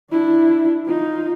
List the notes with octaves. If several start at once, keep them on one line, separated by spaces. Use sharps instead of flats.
D4 E4
D#4 F4